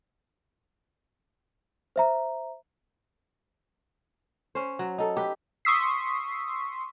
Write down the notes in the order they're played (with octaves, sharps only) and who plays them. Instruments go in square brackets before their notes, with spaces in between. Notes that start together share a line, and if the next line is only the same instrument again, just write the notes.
[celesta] C5 E5 A#5
[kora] C#4 C5
F#3
D#4 A4
G4 B4
[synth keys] C6 C#6 D#6 E6 B6 C7